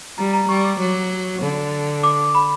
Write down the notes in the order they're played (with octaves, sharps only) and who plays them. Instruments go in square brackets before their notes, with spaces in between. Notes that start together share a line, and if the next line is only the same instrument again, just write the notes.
[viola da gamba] G3 [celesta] A#5
[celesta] A#5
[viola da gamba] G3 [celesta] C#6
[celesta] D6
[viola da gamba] F#3
D3
[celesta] D6
B5